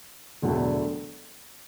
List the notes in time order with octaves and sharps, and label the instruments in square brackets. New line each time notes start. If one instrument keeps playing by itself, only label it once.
[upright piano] E1 D2 D3 F#3 A3